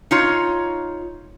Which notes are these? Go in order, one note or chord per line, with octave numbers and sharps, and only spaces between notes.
D#4 F4 C#5